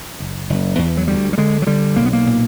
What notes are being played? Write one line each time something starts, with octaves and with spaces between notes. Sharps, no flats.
F#1
F#1
E2
F#3
D2 G3
G3
D3 G#3
F#3
D3 G3
B1 A#3
B3
A#3
A#2